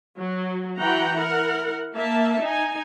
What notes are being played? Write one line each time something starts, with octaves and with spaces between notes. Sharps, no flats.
F#3
E3 F#4 F#5 G5 A#5
E4 A#4 F#5
A#3 E5 A5
D#4 G#5